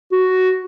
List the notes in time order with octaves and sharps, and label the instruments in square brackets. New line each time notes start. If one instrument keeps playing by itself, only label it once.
[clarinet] F#4